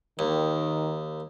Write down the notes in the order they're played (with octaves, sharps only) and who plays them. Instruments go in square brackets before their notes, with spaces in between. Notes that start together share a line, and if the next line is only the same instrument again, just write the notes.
[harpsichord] D#2 [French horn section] D#3